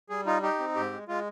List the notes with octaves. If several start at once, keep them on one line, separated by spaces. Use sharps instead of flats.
G3 G#4
D#4 F4
D#4 G4
C4
G#2 G4
G#3
G#3 F4